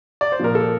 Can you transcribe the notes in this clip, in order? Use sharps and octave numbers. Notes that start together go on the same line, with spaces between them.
D5
C5
A#2 F3 A#4
A4